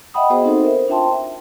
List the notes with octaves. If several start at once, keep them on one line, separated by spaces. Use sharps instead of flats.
D#5 E5 F#5 G5 B5 D#6
B3 F#4 G#4 C5 D#5
C4 D#4 F#4 A4 C5
A#4 C5 E5
D4 F4 E5 G5 A5 C6
E5